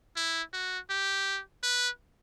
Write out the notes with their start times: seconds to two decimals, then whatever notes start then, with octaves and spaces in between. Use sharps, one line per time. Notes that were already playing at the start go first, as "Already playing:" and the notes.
0.17 E4
0.53 F#4
0.90 G4
1.63 B4